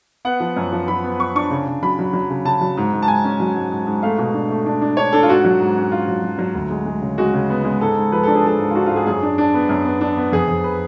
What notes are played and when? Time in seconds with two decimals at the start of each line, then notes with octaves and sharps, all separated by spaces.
0.25 B3 F#5
0.40 F3
0.57 F#2
0.73 F3
0.88 F3 B5
1.04 B3
1.19 B3 C#6
1.35 D4 C#6
1.51 C#3
1.67 C#3
1.83 F#3 B5
1.99 F#3
2.13 F#3
2.30 C#3
2.45 C#3 A5
2.61 F#3
2.77 G#2
2.93 G#2
3.03 A5
3.08 G#2 G#5
3.25 C#4
3.40 F#3
3.56 G#2
3.72 G#2
3.87 G#2
4.03 A3 F5
4.18 B2
4.34 D4
4.50 A3
4.66 D4
4.82 D4
4.97 D4 C#5
5.13 D4 A4
5.23 F4
5.29 G#2 F#4
5.44 F#3
5.61 G#2
5.77 C#4
5.91 G#2 F4
6.08 F#3
6.23 F#3
6.38 F#3
6.55 D2
6.70 G#3
6.86 G#3
7.02 C#3
7.18 G#3 F#4
7.34 C#3
7.50 B3
7.64 G#3
7.81 G#2 A4
7.97 G#2
8.12 F3 B4
8.23 D4 A4
8.35 G#4
8.44 F3 A4
8.59 G#2
8.70 F4
8.75 D4 F#4
8.86 F4
8.91 G#2
8.96 G#4
9.07 F#2 G#4
9.23 D4
9.38 D4
9.54 B3
9.69 F#2
9.85 B3
10.01 D4
10.17 B3
10.32 F2 G#4
10.48 F2
10.64 B4